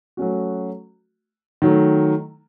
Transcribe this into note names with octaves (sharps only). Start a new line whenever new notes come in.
F#3 A3 C#4 F#4
D#3 F#3 A3